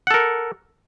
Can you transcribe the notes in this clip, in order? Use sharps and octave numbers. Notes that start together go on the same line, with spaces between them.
A4 A#4 F#5